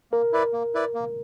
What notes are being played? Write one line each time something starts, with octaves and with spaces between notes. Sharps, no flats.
A#3 A#4
E4 B4 D5
A#3
E4 B4 D5
A#3